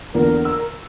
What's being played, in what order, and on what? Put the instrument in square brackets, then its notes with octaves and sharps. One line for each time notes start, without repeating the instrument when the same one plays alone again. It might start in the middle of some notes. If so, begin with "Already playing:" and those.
[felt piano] E2 D3 A#3 [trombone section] A#4
[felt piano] E6